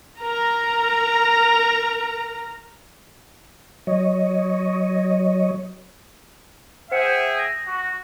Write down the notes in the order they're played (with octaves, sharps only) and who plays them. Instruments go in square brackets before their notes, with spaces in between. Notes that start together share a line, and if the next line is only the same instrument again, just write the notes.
[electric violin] A#4 A#5
[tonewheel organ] F#3 C#5 D#5
[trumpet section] G#4 E5 G5 [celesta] C5 F#5 C#7
[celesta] D#6 A#6
[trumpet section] F#4